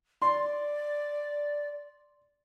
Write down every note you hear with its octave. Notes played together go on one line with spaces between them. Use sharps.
D5 C6